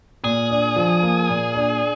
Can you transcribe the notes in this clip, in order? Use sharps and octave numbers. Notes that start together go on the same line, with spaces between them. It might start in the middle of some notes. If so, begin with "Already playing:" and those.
A#2 G#4
D4
F3
A#3
A#2
D4